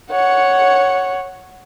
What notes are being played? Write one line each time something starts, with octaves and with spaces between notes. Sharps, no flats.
C#5 F#5